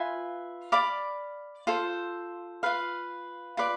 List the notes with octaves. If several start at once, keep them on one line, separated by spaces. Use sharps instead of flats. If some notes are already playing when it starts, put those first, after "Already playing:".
Already playing: F4 B4 E5 G#5
D5 F5 B5 D6
F4 A4 C5
F4 B4 F5
F4 B4 D5